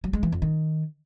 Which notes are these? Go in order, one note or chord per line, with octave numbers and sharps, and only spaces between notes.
F#3
G#3
E3
F2
D#3